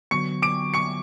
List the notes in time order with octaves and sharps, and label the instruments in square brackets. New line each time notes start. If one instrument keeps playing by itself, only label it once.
[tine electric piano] D3 F#3 B3 [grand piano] C#6 C#7
[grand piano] D6 D7
C#6 C#7